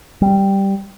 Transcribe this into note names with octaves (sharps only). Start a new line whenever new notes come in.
G3